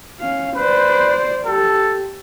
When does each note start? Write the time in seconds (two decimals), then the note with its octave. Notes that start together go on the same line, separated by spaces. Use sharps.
0.20 C#4 F5
0.56 B4 C5 D5
1.46 G4 A4